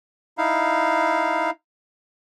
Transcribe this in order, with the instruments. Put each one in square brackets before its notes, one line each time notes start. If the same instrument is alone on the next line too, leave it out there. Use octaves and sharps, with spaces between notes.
[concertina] D#4 E4 F5